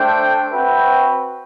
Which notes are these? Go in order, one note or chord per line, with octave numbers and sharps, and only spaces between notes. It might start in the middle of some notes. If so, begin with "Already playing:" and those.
Already playing: A3 D4 A4 C5 G5
C4 F#4 B4 E5 G5